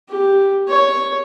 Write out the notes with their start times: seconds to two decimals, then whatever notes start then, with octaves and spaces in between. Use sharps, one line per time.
0.10 G4
0.68 C#5